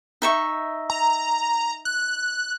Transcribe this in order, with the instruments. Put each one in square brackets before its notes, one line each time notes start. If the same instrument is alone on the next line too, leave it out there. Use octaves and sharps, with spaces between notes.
[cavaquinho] D#4 E5 C#6
[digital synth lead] A#5
F#6